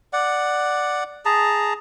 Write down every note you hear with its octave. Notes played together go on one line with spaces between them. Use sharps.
D5 F#5
G#4 A5 A#5